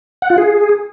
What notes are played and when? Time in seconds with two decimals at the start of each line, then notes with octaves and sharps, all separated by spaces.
0.22 F#5
0.30 F4
0.38 G#4